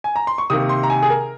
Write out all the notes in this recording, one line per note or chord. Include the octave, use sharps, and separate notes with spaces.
G#5
A#5
C6
C#6
C3 D#3 A#3 D#6
C6
A#5
G#5
G#4
A#4